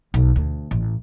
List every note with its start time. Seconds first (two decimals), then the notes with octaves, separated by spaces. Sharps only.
0.14 B1
0.36 D2
0.71 A1